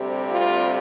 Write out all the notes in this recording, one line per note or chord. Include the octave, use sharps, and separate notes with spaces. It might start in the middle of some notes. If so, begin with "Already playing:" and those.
Already playing: D2 C3 G3 C4
F4